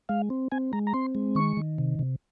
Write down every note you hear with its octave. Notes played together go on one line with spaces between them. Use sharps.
G#3 F5
C4
C4 G#5
G#3 A#5
A#5
C4 C6
G#3
D#3 C#6
D#3
C3
C3